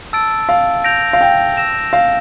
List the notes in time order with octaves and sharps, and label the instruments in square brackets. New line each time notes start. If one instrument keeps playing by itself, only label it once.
[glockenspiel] A5 E6 A6 D7
[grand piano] F5
[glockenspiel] G6 A#6 D7 F7
[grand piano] F5
G5
[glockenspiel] E6 A#6 E7
[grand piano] F5